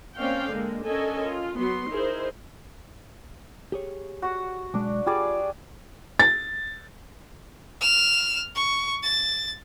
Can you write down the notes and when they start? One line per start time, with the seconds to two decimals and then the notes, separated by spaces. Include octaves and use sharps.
0.18 A#3 C4 C#4 D5 F5 G5
0.50 D3 G#3 A#3
0.85 C#4 D4 A4 A#4 D#5 G#5
1.24 F4
1.58 F#3 B3 C6
1.91 D#4 E4 G#4 A#4 C5
3.72 G4 G#4 C#5
4.22 F#4 F#5
4.74 B1 G#3 D4
5.06 G3 F4 G#4 D5
6.19 A6
7.81 F6 E7
8.55 C#6
9.03 A6